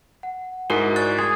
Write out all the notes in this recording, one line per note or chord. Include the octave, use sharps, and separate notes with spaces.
F#5
G#2 E4 F#4 A#4 E5 G#5
D5 G#5 C#6 F#6 A6
G#4 C6